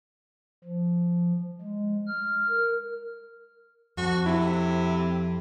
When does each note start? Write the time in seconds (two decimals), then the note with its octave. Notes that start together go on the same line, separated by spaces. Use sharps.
0.64 F3
1.62 G#3
2.07 F6
2.49 A#4
3.97 F2 F#4
4.26 C3 E4